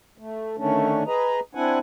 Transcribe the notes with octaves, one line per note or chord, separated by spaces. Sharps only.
A3
D3 D#3 A3 C#4 D4
G#4 B4 D#5 A#5
C4 D4 E4 F#5 G#5